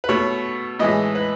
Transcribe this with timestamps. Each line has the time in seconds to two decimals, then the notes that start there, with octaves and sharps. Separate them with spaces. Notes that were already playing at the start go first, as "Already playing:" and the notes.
0.04 B4
0.09 B2 A3 C#5
0.79 A2 E3 G#3 D#5
1.15 B4